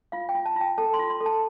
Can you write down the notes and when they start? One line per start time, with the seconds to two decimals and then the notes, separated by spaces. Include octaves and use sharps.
0.12 F4 F5
0.29 G5
0.35 F4
0.46 A5
0.56 F4 G5
0.78 A4 A5
0.94 C6
0.99 F4
1.10 C6
1.20 A4
1.26 A5